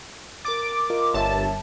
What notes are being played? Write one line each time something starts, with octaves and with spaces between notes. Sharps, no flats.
A#4 D6 A6
F4 A#4 D#5
G1 A#4 C#5 E5 A5